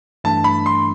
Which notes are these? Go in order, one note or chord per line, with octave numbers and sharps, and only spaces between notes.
G2 E3 A3 D4 A5
B5
C6